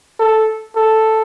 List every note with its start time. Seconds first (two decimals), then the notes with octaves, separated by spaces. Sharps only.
0.20 A4
0.76 A4